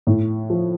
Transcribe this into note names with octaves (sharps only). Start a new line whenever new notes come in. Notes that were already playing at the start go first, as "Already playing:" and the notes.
A2
F3